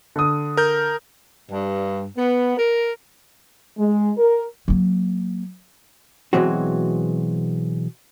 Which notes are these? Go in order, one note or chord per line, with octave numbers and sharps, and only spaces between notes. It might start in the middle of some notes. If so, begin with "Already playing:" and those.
D3 D#6
A#4 G6
G2
B3
A#4
G#3
A#4
F#3 A#3
B2 E3 F#3 G#3 C4 F#4